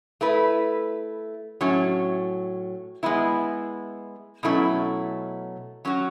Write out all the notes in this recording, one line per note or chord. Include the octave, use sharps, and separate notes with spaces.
A3 E4 B4
A2 F#3 C#4
G#3 B3 E4
B2 F#3 A3 C#4 E4
F#3 C#4 F#4